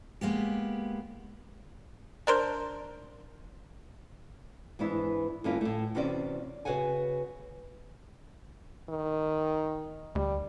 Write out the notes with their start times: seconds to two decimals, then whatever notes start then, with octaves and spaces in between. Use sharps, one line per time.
0.21 G#3 A#3 B3 G4
2.27 D4 A#4 C5
4.79 G#2 E3 B3 D4 E4
5.44 G2 D3 A#3 C#4 E4 F4
5.61 A2 A3
5.95 E2 C3 C#4 F#4 C5 D5
6.65 C#3 F#4 B4 C#5 F#5 G#5
8.89 D#3
10.15 D2 G3